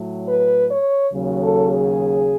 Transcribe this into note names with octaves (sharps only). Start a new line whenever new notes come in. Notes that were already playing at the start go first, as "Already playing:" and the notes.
Already playing: A2 F#3
B4
C#5
D#2 C#3 F#3
A4
G#4